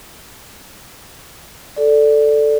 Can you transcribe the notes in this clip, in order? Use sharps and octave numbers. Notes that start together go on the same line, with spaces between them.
A4 D5